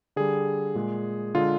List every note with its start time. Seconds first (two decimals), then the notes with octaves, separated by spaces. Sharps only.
0.16 D3 G3 G#4
0.75 A#2 G#3
1.34 D3 G#3 F4